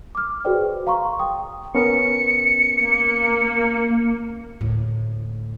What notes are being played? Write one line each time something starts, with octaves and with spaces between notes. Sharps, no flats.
D6 F6
F#4 G#4 B4 C5 D5 G5
F5 A#5 C6 C#6
G5 D#6
B3 C#4 A#4 C#7
A#3
D2 A2